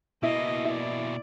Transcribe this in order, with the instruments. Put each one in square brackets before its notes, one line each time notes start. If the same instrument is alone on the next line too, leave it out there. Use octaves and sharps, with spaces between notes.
[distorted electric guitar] B2 A#3 [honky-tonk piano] E4 [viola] D#5
[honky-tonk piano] E4 [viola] D5